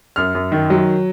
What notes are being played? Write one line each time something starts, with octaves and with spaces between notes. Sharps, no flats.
F#2 F6
F#2
D#3
F#3